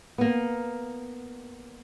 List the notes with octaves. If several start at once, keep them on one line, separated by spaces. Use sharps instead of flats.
A#3 B3